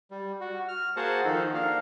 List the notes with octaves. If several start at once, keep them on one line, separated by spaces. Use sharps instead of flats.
G3
F#4
F6
A#3 F#4 G#4 C5 F#5 A5
D#3 F3 D#4 A4
A#3 D4 F5